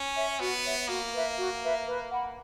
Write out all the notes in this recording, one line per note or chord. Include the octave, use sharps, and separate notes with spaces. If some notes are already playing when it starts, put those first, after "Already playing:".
Already playing: C#4
C#5 E5
B3 F#4
C#5 E5
A#3 F#4
B4 E5
F#4
B4 E5
B4
F#5 B5